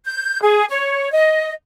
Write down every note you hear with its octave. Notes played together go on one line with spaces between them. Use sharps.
G6
G#4
C#5
D#5